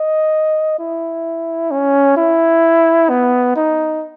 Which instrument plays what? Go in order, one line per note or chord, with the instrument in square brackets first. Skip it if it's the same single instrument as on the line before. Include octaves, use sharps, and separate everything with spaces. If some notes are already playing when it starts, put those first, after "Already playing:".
Already playing: [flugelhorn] D#5
E4
C#4
E4
B3
D#4